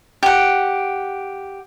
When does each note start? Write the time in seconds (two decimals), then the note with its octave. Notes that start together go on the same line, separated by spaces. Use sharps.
0.23 G4 F#5